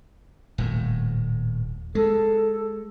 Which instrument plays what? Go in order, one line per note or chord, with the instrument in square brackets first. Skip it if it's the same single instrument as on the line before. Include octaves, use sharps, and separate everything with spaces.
[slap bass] D#1 A2
[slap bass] G#3 [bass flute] A4